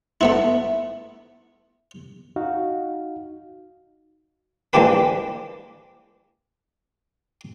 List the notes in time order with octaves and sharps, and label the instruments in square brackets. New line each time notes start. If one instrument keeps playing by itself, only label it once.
[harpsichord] A3 B3 E4
[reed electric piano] D#4 F#4 F5
[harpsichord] E3 G#3 A#3 D4 G4 B4